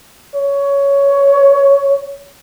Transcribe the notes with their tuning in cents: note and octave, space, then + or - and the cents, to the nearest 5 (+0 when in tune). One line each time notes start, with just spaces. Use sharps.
C#5 +10